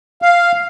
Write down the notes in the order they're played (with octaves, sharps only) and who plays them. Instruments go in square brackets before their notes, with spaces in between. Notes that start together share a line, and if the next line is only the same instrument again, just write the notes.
[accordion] F5